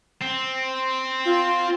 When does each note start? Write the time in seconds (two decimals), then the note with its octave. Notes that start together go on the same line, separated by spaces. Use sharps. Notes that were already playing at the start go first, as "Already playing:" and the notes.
0.21 C4
1.25 F4